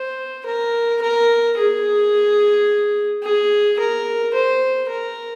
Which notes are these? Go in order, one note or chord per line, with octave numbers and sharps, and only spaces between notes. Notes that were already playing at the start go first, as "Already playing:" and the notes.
Already playing: C5
A#4
A#4
G#4
G#4
A#4
C5
A#4